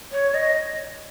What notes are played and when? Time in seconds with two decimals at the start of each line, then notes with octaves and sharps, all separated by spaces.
0.12 C#5
0.34 D#5